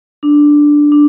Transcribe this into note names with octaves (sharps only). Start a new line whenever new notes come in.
D4
D4